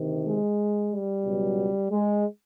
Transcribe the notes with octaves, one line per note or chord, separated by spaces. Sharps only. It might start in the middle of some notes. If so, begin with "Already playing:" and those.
Already playing: D2 C3 D#3
G#3
G3
C#2 B2 F#3
G#3